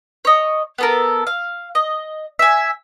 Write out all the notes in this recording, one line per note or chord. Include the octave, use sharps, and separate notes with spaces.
C#5 D#5
B3 A4 A#4
F5
D#5
E5 G#5